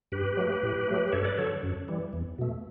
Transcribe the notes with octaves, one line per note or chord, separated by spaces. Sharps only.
G2 G4 B4
F#3 A3
A2
F#3 A3
B4
G2 A4 C#5
B4 D5
D3 F#3 A4 C#5
F#2
E3 G3
E2
B2 A3